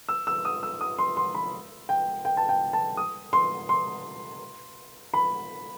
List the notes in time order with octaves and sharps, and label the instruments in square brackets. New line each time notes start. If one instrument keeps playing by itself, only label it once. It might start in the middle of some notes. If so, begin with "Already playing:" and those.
[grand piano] E6
E6
D#6
E6
D#6
C6
C6
B5
G5
G5
A5
G5
A5
D#6
C6
C6
B5